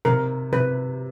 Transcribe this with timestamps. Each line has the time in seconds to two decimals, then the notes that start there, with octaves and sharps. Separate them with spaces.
0.05 C3 A#4
0.52 C3 B4